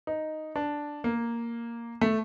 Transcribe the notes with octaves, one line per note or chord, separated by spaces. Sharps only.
D#4
D4
A#3
A3